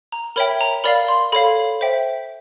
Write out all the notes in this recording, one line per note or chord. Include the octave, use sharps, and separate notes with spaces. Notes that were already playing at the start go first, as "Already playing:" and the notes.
A#5
A#4 C#5 E5 G5 B5
A#5
A#4 D5 F5 B5
C6
A4 C#5 F5 B5
C5 E5 G5